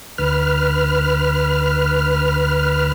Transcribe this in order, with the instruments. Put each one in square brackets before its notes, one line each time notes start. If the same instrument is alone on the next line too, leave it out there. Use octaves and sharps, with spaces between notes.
[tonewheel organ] D2 B4 F6